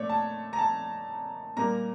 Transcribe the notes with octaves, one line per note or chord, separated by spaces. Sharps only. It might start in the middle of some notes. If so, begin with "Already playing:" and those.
Already playing: A#2 A3 C#5 D5
A5
A#5
A5
A#2 G3 A#3 A#5